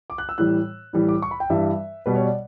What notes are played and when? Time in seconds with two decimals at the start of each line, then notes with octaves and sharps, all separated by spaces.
0.10 D6
0.18 F#6
0.29 E6
0.38 A2 E3 G3 F#6
0.93 A2 E3 G3
1.08 D6
1.22 C#6
1.31 B5
1.40 G5
1.50 G2 E3 G3 E5
2.06 B2 G3 B4
2.16 C#5
2.25 D5